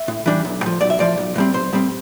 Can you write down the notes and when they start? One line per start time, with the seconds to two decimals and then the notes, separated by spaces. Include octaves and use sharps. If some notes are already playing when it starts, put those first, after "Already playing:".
Already playing: E5
0.08 A2
0.26 E3 G3 D4
0.45 B1
0.63 A2 F3
0.81 B1 D5
0.90 E5
0.99 A2 F3 D5
1.18 B1
1.36 A2 G3 C4
1.54 B1 C5
1.72 A2 G3 C4